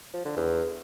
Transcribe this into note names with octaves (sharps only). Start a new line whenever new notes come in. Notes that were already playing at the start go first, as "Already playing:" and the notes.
F3
D3
E2